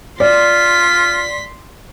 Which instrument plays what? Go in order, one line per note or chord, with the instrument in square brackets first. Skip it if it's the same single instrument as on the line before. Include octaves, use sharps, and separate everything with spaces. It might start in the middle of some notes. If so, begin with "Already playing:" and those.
[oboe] F4 [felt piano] D5 [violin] C6 B6